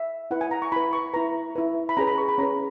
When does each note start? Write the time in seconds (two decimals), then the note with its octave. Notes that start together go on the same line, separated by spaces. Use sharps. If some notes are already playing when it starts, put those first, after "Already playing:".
Already playing: E5
0.31 E4 B4 F#5
0.41 G#5
0.51 A#5
0.62 C#6
0.72 E4 B4 B5
0.93 C#6
1.14 E4 B4 A#5
1.55 E4 B4
1.89 B5
1.97 C#4 G#4 B4 A#5
2.07 B5
2.18 C#6
2.29 B5
2.38 C#4 G#4 B4 A#5